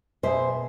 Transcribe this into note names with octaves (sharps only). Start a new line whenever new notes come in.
B2 G#3 C5 E5